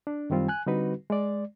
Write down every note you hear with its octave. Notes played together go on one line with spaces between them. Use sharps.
D4
F#2 D#3 G3 C4 F4
G#5 F#6
D3 G3 C4 D#4 F#4 B4
G#3 D5